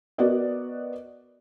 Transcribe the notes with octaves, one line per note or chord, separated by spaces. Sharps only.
B3 F#4 A#4 D5 D#5